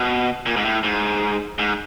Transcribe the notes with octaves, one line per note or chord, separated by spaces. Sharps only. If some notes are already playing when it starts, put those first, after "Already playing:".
Already playing: B2
A#2
G#2
A2
G#2
G#2